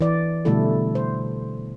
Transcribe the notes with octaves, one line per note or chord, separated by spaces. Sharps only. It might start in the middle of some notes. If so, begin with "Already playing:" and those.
E3 D5
B2 D3 G3 A3 E4 A4
C5